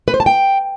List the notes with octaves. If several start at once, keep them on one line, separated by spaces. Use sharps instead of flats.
B4
C5
A5
G5